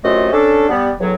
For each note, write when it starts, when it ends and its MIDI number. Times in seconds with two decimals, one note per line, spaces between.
0.04 0.29 42
0.04 0.29 48
0.04 0.29 57
0.04 0.29 65
0.04 0.29 75
0.33 0.69 61
0.33 0.69 62
0.33 0.69 69
0.69 0.90 55
0.69 0.90 59
1.00 1.14 40
1.00 1.14 45
1.00 1.14 54